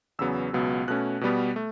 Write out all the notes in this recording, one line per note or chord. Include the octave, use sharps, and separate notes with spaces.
E2 C#3 F#3 B3 E6
C#2 B2 F#3 B3
B2 A3 C#4 F#6
B2 G3 B3
A3